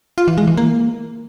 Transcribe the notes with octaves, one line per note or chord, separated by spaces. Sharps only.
F4
E3
G#3
E3
A#3